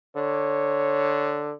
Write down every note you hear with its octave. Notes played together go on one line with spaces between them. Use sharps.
D3 C#5